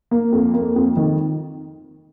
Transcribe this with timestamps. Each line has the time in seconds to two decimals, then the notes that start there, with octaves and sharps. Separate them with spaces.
0.11 A#3
0.32 F2
0.54 A#3
0.76 F2
0.97 D#3